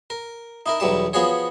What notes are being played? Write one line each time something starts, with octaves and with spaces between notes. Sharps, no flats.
A#4
D#4 E4 A#4
B1 E2 F#3 G3 A5
F3 B3 F#4 G#4 C#5